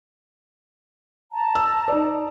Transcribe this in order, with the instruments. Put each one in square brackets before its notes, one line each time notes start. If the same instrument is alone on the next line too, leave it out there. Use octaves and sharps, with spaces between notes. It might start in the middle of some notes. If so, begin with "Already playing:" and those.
[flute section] A5 A#5
[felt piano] E6
D#4 D5